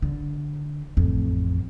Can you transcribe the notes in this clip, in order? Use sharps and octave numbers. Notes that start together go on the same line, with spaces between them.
D3
A1 F2